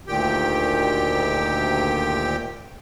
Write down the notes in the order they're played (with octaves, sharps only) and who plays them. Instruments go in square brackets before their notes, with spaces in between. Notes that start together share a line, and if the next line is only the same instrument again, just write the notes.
[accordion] D2 A#2 D#3 G4 G5